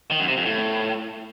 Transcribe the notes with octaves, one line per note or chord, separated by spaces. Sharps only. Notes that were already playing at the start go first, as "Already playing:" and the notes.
D#3
F#2
C3
F2
A2